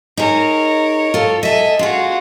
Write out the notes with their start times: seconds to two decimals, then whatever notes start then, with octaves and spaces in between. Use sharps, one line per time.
0.17 D#4 G#4 A#4 C#5
1.14 F4 A4
1.43 A4 D#5 E5 G#5
1.79 C4 F4 F#4 G#4